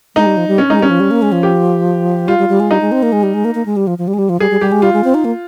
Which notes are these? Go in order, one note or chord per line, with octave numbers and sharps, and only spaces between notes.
G#3 D#4
G3
F3
G3
C#4
G#3 D#4
G3 C#4
F3
G3
A#3
G#3
F3
G4
G3 F4
G3
G3
G#3
G3 D#4
G#3
C4
A#3
G#3
G3
G#3
A#3
A#3
G#3
G3
F3
F3
G3
G#3
G3
F3
G3 G#4
G3
G3 G4
G#3
G3 F4
G#3
C4
D#4
A#3